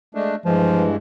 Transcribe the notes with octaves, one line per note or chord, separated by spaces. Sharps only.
G#3 A3 D4
G2 E3 F3 G#3